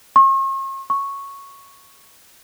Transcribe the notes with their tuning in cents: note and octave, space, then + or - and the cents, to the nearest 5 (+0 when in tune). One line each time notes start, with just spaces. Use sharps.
C#6 -45
C#6 -5